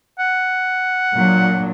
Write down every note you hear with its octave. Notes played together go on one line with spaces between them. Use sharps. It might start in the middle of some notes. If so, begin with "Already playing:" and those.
F#5
A#2 F#3 D4